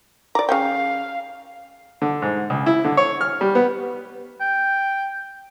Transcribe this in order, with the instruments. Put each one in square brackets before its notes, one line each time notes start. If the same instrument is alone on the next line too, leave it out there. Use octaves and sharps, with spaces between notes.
[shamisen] D5 A#5 [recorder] D6
[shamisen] C#3 C#4 G5 [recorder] F5
[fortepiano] D3
G#2
C#2
E4
D3
C#5
F6
G3
B3
[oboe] G5